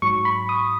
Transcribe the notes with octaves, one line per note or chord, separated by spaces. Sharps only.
G#2 F#3 C#6
B5
D#6